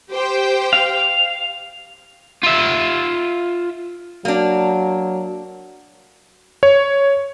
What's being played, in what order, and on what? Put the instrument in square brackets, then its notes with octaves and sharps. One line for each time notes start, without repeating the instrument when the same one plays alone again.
[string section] G4 C5 G5
[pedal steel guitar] F5
[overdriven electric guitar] F4 E5
[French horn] F#3 [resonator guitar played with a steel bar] A#3 D4
[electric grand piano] C#5